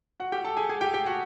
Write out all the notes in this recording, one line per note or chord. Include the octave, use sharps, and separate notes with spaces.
F#4 F#5
G4 G5
A4 A5
G#4 G#5
G#4 G#5
G4 G5
G4 G5
F#4 F#5